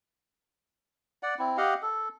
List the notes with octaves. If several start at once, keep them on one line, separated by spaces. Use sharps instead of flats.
D5 F#5
C4 E4
G4 D#5 F5 F#5
A4